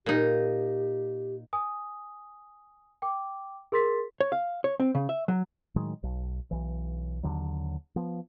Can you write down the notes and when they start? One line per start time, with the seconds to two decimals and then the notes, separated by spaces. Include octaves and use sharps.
0.06 A#2 D#4 G4
1.53 G#5 D#6
3.02 G5 D6
3.72 G#4 A#4 C6 A6 B6
4.21 C#5
4.32 F5
4.64 C#5
4.80 C4
4.95 C#3
5.09 E5
5.28 F#3
5.76 A2 D#3 F#3 G#3
6.03 B1
6.51 B1 E3
7.23 D#2 D3 F#3
7.96 F3 B3